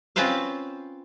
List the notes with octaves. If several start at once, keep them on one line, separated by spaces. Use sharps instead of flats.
C4 C#4 F4 B4 C5 F5